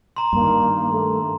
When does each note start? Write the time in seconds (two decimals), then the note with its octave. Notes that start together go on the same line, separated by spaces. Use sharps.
0.16 A#5 C6
0.33 G2 D#3 A#3
0.92 A3